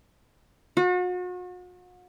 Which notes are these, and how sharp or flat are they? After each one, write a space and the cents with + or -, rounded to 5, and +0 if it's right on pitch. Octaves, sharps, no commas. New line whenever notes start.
F#4 -40